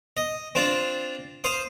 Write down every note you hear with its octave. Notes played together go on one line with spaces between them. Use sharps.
D#5
C4 D4 F4
C5 F5 D#6